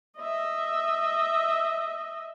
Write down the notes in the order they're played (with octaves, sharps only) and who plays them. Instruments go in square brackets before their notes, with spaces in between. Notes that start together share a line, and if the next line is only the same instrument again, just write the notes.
[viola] D#5 E5